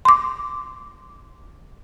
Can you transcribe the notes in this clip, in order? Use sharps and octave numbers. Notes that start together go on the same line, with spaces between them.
C6 D6